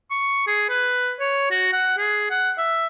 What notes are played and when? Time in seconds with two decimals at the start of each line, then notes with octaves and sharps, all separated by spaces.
0.11 C#6
0.47 G#4
0.69 B4
1.20 C#5
1.51 F#4
1.72 F#5
1.98 G#4
2.30 F#5
2.58 E5